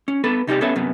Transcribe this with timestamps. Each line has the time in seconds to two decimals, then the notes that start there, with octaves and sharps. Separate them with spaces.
0.08 C#4
0.24 B3 A4 B4
0.47 C3 D#4 F#4 G4 D5
0.61 B3 C#4 A4 B4 C#5 E5
0.76 F#2 C3 B3